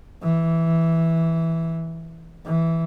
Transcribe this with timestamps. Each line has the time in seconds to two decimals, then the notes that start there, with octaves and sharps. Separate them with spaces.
0.23 E3
2.45 E3